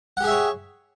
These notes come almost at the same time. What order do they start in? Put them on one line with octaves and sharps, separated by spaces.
F#5 G4 G#4 E5 C#5